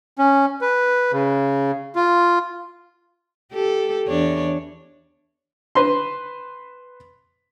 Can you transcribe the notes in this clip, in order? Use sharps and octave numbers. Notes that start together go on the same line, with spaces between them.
C#4
B4
C#3
F4
G4 A4
E2 D4 C#5
B4 C5 C6